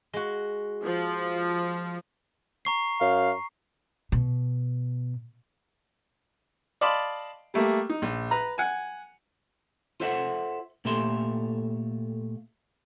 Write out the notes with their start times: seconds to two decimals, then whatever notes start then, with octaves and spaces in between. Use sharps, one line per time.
0.13 G#3 F#4
0.84 F3
2.65 A#5 C#6 C7
3.01 F#2 F5
4.12 B2
6.81 D5 D#5 F5 A5 B5 C6
7.54 G3 A3 A#3 G4
7.89 D#4
8.02 A#1
8.31 B4 A#5
8.58 F#5 G#5
10.00 F4 A4 C5 E5 F#5
10.85 A#2 A3 G4 A4 E5 C6